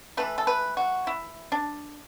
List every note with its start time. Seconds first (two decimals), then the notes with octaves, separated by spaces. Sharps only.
0.17 E3 A3 B4
0.38 A4
0.47 B4
0.77 F#4
1.07 E4
1.52 D4